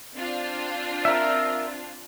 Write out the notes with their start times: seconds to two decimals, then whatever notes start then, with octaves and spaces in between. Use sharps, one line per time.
0.16 C4 D4 F4
1.05 A#4 E5